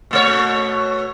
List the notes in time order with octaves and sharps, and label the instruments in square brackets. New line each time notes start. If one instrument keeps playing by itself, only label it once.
[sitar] B2 A3 C#5